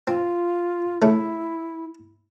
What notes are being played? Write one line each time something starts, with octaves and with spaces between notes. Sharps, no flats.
C4 F4
C#3 A3 E4